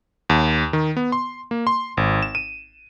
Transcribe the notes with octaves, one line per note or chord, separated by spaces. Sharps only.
D#2
D#3
B3
C6
A#3
C6
G#1
E7
D#7